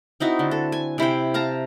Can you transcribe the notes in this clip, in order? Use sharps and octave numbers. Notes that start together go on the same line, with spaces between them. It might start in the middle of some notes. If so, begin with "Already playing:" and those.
C4 D#4 E4 F#4
D3
A4
G#5
C3 E4 C5 G5
F5 A5 A#5